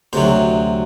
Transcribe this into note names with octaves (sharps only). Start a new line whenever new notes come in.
D2 C3 F#3 C5